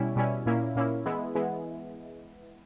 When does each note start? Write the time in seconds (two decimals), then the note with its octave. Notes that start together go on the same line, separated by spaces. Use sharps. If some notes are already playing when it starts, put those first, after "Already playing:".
Already playing: B2 G3 C#4 E4
0.16 B2 G3 C#4 E4
0.46 A#2 A#3 C#4 E4
0.76 A#2 A#3 C#4 E4
1.06 E3 G#3 B3 E4
1.35 E3 G#3 B3 E4